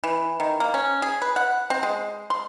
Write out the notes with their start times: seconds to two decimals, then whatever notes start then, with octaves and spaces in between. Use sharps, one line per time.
0.04 E3
0.40 D#3
0.60 A#3
0.74 C#4
1.02 G#4
1.22 B4
1.36 F#5
1.70 C4
1.83 G#3
2.30 C6